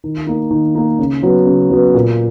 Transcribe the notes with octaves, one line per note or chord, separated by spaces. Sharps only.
D#3
A#3 D#4
D#3
A#3 D#4
C#3
F#3 B3 F#4 B4
C#3
F#3 B3 F#4 B4
A#2